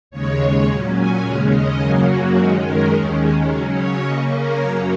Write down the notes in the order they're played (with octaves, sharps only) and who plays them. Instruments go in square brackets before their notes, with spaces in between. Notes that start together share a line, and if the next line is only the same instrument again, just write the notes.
[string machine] D#2 C#3 G#3 C#5
A#2 F#3 C#4
G#5
D#2 C#3 G#3 C#4 F#5
D#5
F#2 C#3 F#3 A#3 C#4 G#5
F#4
F#2 D#3 G#3 C#4 A#4
A#4
D#2 D#3 G#3 C#4
C#3 F#3 C#4 A#4
C#5
C#3 A#3 C#4 D#5
A#4
F#2 F#3 A#3 C#4 A#5